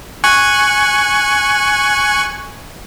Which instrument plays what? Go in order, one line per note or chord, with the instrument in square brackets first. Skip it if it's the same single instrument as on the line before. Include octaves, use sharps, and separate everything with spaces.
[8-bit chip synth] G#5 C#6 F#6